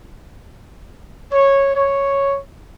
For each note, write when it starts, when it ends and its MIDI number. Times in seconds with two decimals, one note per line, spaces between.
1.32 1.73 73
1.75 2.38 73